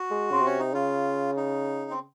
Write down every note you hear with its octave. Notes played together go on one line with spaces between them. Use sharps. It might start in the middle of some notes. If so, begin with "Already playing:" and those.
Already playing: F#4
G#3
C#3 C4
C3 C#4
D#4
C#3 F4
D#4
C4